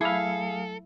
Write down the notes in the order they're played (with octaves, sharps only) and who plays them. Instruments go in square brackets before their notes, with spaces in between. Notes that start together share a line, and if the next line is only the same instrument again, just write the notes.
[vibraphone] F#3 A3 [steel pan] E4 [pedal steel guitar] G#4 F5 [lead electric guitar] A4